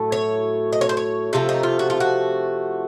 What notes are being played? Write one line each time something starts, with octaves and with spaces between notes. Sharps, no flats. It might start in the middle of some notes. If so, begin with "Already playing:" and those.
Already playing: A2 F#3 A3
C#5
D#5
C#5
C5
C#5
C3 F3 A3 F4
D#4
F4
F#4
F4
F#4